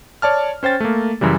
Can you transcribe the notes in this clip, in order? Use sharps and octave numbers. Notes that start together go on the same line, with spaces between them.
C#5 D5 A5 F6
C#4 C5 G5 A6
A3 A#3
F#2 C#3 E3 G3